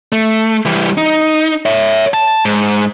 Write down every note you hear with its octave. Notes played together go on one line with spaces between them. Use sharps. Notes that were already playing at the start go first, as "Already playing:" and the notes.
A3
E3 G3
D#4
C#5 E5
A5
G#2